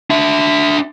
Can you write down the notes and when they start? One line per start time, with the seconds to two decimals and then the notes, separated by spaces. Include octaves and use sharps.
0.10 D4 E5